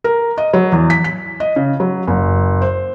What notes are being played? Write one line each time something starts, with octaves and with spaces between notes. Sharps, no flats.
A#4
D#5
F#3
E2
B6
B6
D#5
C#3
F#3
F#1
C5